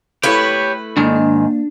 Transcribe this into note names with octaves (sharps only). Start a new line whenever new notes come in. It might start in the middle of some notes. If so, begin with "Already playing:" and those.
A3 E4 G4 B4 C#5
G#2 D#3 A#3 D4